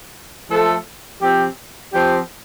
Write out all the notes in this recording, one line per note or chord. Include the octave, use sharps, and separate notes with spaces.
F3 A3 F4 A4
F3 C4 G4
F3 C4 G4